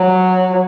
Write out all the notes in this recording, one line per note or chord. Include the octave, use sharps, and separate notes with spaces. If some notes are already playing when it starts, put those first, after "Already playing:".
Already playing: F#3